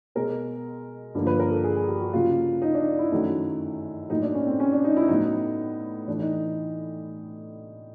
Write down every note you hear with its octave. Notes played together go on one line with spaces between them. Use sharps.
B2 G#3 B3 A#4
G2 D3 F3 A#3
B4
A#4
A4
G#4
G#4
G4
F#4
C#3 F#3 A#3 F4
D#4
D4
E4
F#2 D#3 F#3 A3
A2 F#3 A#3 D#4
D4
C#4
C4
C#4
D4
D#4
E4
A2 F#3 B3 D#4
A2 E3 A3 D4
D#4